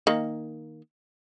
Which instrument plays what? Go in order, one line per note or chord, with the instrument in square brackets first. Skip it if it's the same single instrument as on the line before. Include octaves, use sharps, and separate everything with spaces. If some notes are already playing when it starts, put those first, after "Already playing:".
[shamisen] D#3 A#3